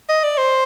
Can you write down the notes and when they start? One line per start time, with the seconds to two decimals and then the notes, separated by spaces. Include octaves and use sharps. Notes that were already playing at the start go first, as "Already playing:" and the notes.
0.09 D#5
0.24 D5
0.38 C5